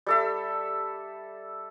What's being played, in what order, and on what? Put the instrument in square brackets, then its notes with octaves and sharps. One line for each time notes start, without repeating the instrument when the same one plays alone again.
[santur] G3 A4 E5